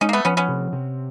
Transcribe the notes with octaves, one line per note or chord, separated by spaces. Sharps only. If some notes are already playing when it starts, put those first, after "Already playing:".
G#3 C#4 D#4
A#3
A3 B3
F3 B3 C#4
B3 C#4
C3
C3